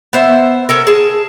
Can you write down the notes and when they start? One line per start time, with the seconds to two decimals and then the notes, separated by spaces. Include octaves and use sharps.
0.13 B3 C5 E5
0.69 C#4 A4 A#4
0.87 G#4 A5